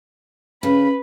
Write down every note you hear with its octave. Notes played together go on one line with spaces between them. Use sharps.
C#3 B4 B5